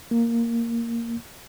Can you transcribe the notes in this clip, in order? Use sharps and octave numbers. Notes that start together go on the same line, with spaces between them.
A#3